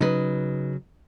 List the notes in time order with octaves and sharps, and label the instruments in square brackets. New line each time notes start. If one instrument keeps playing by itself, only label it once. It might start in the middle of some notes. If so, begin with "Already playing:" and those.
[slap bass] C#3 F#3 [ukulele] D#4 B4